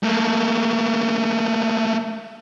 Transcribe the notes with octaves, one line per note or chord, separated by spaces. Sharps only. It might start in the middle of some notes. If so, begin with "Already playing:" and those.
A3 A#3